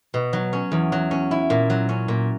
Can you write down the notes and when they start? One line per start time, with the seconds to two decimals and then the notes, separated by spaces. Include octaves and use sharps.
0.14 B2
0.33 F#3
0.53 C#4
0.72 E2
0.92 F#3
1.11 C#4
1.31 E4
1.50 A#2
1.70 F#3
1.89 C#4
2.08 A#2